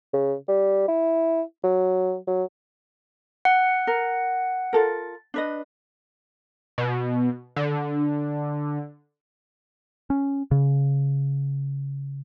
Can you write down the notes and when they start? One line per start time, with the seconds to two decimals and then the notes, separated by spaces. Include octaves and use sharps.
0.13 C#3
0.48 G3
0.88 E4
1.64 F#3
2.27 F#3
3.45 F#5
3.87 A#4
4.73 F4 A4 A#4
5.34 D4 B4 D#5
6.78 B2
7.56 D3
10.10 C#4
10.51 C#3